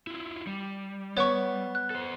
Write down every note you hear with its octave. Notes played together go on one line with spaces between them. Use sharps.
E4 F4
G3
B3 C#5 F#5 C#6
F#6
A4 C5